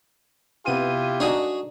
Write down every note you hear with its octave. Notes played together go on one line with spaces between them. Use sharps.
C3 B3 E4 F4 G4 D#7
D4 D#4 F#4 G#4 C#5